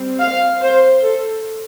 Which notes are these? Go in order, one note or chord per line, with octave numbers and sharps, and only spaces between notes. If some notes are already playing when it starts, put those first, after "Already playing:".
Already playing: G3 C4
F5
C5
A4